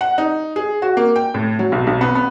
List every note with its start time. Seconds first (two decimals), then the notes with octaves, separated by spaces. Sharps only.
0.01 F#5
0.18 D#4
0.56 G#4
0.82 F#4
0.97 A#3
1.16 G5
1.34 A2
1.59 F#3
1.72 B1
1.87 B1
2.01 B3
2.15 B3